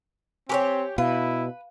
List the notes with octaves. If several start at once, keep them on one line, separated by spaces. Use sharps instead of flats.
C4 G4 A#4 C#5 G#5 C#6 D6
B2 E4 B4 F5